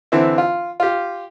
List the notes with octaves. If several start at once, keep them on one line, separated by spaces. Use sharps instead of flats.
D3 E3 C4 E4
F4
F4 G4